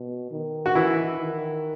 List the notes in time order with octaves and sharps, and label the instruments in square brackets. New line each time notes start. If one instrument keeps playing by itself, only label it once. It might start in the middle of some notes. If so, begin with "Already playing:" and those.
Already playing: [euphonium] B2
D#3
[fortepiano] F#4
E3 E4
[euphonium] D#3